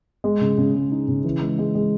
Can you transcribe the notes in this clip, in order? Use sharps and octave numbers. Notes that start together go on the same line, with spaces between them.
G#3
C#3
C#3
G#3
D#4
C#3
E3
G#3
G#3
G#3